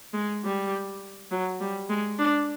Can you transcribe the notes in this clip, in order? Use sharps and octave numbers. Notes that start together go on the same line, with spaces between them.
G#3
G3
F#3
G3
G#3
D4